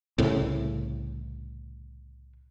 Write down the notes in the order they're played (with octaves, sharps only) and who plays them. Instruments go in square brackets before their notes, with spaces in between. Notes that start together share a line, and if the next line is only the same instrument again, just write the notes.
[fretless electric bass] C2 A2 C#3